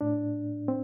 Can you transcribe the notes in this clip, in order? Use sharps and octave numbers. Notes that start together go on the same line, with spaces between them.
A2 D4
C4